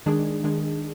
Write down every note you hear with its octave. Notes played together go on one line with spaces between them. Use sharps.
D#3 G#3 D4 G#4
D#3 G#3 D4 G#4